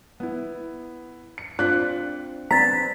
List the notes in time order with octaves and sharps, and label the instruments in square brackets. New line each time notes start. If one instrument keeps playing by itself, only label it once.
[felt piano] B3 E4
C#7
[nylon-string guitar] C4 D4 F4 [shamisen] D5 [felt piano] F#6 B6
[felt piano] B3 C4 D4 [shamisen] A#5 [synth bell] A6 B6